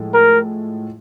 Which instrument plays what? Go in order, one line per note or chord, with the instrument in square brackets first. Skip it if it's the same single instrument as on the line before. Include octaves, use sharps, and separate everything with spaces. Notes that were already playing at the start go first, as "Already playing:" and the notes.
Already playing: [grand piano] A2 F3 G#3
[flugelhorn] A#4